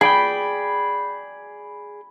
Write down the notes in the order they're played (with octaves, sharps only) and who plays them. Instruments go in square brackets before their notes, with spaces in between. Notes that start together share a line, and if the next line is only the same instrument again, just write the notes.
[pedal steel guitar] G#4 D5 G5 [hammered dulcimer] B5